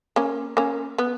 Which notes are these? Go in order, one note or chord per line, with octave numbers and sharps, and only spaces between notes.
A#3 C#4
A#3 C#4
B3